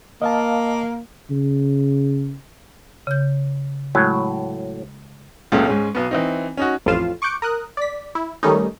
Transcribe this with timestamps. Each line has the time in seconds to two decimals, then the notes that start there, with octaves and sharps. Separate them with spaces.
0.22 A#3 D#5 F5 A5
1.31 C#3
3.07 C#3 G6
3.95 A2 F#3 G#3
5.52 C#2 A#2 C#3 F#3 A3
5.66 G#2 G#3 C#4
5.95 B1 B3
6.11 E3 C4 D#4
6.57 C#4 D#4 F#4
6.86 A1 F2 A2 F4 F5 E7
7.22 C#6 D6 F#6 G6 C#7 D7
7.42 A#4 D#6 F#6
7.77 D5 B6
8.15 E4
8.43 D#3 G3 A3 C#4 D#4